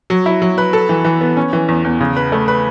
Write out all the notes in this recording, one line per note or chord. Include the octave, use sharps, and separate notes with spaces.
F#3
E4
F#3
B4
A4
E3
E3
B3
C#4
E3
E2
E2
C#3
B4
A3
B4